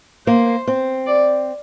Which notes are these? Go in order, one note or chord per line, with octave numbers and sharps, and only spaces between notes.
A#3 C5
C4
D5